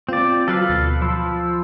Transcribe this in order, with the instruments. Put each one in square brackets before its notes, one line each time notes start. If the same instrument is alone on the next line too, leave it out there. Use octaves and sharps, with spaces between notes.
[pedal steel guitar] C4 D5 [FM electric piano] F4
[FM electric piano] F#3 F4 [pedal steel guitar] A4 B4 F5
[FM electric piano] D2 B2
[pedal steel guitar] F3 [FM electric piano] B5 E6